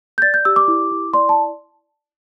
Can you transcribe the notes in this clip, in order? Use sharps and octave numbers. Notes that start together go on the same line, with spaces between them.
G6
D5 A6
G6
G4 E6
D6
E4
E4
D5 C6
A5